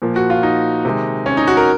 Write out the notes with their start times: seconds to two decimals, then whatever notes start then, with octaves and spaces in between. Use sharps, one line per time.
0.02 A#2 F3 A#3
0.16 F#4
0.30 F4
0.43 D#4
0.85 C3 D#3 G#3
1.26 C#4
1.37 D#4
1.48 F#4
1.57 A#4